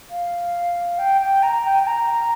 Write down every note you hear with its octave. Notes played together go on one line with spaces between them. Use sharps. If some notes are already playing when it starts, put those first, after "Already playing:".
F5
G5
G5
A#5
G5
G5
A#5